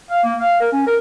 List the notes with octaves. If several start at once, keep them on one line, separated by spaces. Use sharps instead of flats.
F5
A#3
F5
A#4
C#4
A#4